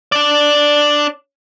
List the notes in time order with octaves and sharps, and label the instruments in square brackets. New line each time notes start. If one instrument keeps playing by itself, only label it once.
[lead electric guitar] D4 D5